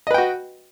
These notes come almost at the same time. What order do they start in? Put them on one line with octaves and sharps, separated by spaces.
D#5 B4 G5 F#4